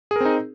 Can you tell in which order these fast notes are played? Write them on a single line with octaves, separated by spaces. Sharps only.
G#4 A#4 C4 D#4